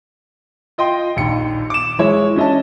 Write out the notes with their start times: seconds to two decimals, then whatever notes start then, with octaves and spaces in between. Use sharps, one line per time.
0.78 F4 D#5 G5 C6
1.16 A#1 D#2 C#7
1.70 D6 E7
1.99 E3 G#3 E4 C#5
2.36 C#4 D4 D#5 E5 A5